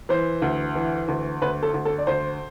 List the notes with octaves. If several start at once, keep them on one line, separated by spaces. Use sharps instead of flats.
E3 C5
D2
E3
D2
D2 B4
A4
D2
A4
D5
D2 C5